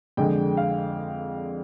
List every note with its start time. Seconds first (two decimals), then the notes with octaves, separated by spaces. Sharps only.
0.17 F2 D3 G#3 G5
0.57 F5